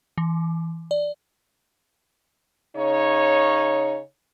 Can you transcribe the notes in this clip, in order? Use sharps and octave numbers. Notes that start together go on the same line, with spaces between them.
E3
D5
C#3 D#4 C#5